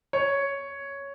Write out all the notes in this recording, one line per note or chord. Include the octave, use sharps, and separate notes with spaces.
C#5